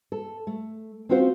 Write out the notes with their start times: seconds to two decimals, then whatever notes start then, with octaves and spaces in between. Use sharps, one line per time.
0.12 A4
0.47 A3
1.09 C4 C#4 F4 F#4 C5